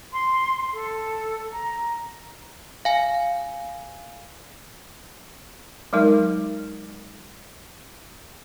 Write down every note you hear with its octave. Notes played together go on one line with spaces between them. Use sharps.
C6
A4
A#5
F5 G#5
F#3 G#3 D#4 A#4